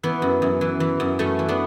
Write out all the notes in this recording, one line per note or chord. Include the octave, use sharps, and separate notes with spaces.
E3 B3
F#2
F#2
E3
E3
F#2
F#2 A3 C#4
E3
B3 D4